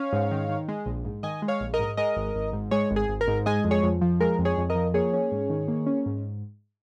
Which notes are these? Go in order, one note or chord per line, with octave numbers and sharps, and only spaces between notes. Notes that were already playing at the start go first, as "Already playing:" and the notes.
Already playing: C#4 C#5 F5
G#2
D#3
D#3
G#3
A#1
G#2
D#3 D#5 G#5
G#3
C#5 F5
A#1
A#4 D#5
G#2
G#3 A#4 D#5
G#1
G#1
G#2
G#3 G#4 C#5
G#1
G#4
G#1
A#4
G#2
G#3 D#5 G#5
F2
G#4 C#5
F2
F3
G#3 A#4
F2
G#4 C#5
F2
A#4 D#5
F3
A#3 G#4 C#5
C#4
G#2
D#3
A#3
C#4
G#2